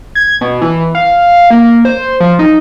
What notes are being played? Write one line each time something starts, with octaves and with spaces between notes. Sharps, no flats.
G#6
B2
E3
F5
A#3
C5
F3
D#4